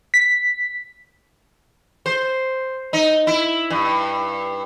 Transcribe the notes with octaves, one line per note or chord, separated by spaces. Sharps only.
B6
C5
D#4
E4
G2